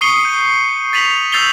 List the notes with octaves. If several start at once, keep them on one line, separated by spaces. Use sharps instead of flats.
C#6 D#6 C7 C#7 D#7 G7
G6
A6 B6 D#7 F7 F#7
E6 G6 A6 C7 F7 G7